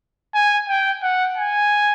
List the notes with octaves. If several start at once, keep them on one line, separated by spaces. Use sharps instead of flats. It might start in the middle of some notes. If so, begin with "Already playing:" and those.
G#5
G5
F#5
G#5